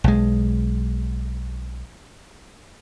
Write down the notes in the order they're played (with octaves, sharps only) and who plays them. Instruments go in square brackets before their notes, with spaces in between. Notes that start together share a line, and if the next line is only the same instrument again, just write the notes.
[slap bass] B1 G#3